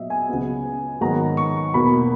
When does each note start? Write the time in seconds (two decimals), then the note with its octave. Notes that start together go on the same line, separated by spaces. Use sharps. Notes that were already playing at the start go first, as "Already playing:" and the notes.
Already playing: A#2 F#3 B3 D#5 E5
0.10 G#5
0.28 C#2 C#3 F#3 B3
1.01 G#2 D#3 F#3 B3 A#5
1.37 C#6
1.73 E2 B2 A#3 B5